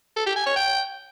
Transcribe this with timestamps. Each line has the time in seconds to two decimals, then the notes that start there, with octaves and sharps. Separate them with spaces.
0.16 A4
0.26 G4
0.36 G#5
0.46 C#5
0.56 G5